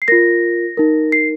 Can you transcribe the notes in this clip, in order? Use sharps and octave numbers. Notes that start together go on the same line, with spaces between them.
C7
F4 A#4 A#6
D#4 A#4
C7